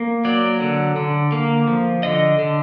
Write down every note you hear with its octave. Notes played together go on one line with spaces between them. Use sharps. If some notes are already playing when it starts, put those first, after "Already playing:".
Already playing: A#3
F#3 D5
D3
D3
A#3
F3
D3 D#5
D3